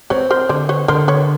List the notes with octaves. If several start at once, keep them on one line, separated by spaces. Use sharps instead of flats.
C4 B4 C#5
A#4 C5
D3 C5 D5
B4 C#5
D3 A#4 C5
B4 C#5